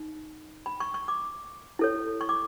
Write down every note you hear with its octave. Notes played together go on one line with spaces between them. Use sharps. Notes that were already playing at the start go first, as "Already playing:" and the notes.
Already playing: D#4
B5
C#6
C#6
D6
E4 A4 C#5
C#6
D6